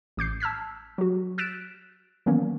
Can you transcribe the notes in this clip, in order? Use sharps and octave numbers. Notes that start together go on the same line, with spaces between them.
A1 D6 G6 C7
A5 E6 F6 G#6 B6
F#3 F#4
E6 F#6 A6 B6 D7 E7
D#3 E3 F#3 A#3 B3 C#4